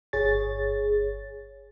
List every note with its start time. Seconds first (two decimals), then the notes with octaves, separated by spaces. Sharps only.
0.13 G1 G#4 C#5 A6